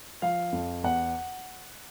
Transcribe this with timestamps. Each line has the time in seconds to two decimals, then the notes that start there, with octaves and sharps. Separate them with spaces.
0.22 F3 F5
0.53 F2
0.83 E2 F#5